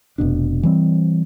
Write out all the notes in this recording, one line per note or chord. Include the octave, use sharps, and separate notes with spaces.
F1 B2 D4
E3 G3 C4